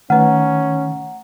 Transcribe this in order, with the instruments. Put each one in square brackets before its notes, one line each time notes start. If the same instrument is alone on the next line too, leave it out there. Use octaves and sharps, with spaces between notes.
[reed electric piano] D#3 [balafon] A3 B4 [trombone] C#4 [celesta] F#5 A#5